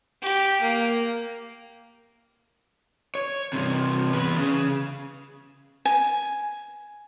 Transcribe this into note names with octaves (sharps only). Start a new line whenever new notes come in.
G4
A#3
C#5
G2 C3
E2 B4
C#3
G#5